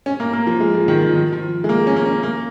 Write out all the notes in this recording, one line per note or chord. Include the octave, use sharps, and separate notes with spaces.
C#4
A#3
A#3
F3
G#3
F3
D#3
F3
D#3
F3
G#3
A#3
C#4
A#3
C#4
A#3